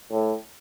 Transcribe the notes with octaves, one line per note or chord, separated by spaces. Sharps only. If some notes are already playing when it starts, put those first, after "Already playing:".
A2